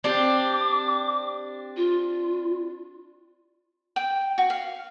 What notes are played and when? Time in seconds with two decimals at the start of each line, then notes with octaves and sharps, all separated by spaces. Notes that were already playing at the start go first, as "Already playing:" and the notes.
0.04 C4 D4 G4 D6
1.76 F4
3.96 G5
4.38 F#4
4.50 F5